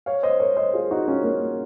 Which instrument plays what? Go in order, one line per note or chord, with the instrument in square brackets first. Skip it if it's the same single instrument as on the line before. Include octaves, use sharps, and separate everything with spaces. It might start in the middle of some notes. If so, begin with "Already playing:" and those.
[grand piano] C#5 F5
C5 D#5
A#4 C#5
C5 D#5
F4 G#4
D#4 F#4
C#4 F4
A#3 C#4